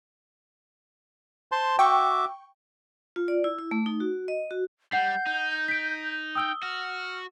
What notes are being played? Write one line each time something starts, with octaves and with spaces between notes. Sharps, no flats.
C5 A5 C6
F#4 E5 G5 C#6 D6
F4
D5
E4
E4
A3
D#4
F#4
D#5
F#4
G3 F#5 G6 C7
D#4
B6 D7
G5 D#6 E6 G7
F#4 F6